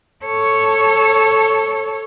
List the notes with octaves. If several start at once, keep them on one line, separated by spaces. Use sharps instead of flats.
A4 C#5